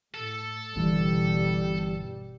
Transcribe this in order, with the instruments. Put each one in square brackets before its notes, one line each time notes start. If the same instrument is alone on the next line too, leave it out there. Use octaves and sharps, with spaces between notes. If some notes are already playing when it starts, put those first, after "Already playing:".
[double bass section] A2 [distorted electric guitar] A4
[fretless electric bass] G1 G2 E3 [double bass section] B2 G3